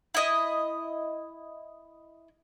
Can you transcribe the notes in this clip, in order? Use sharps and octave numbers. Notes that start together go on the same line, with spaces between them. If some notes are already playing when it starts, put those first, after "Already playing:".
E4 D#5